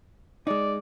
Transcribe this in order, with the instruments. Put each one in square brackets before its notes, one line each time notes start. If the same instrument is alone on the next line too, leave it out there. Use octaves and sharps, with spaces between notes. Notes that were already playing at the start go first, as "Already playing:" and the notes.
[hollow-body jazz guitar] G#3 D#4 [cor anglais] D5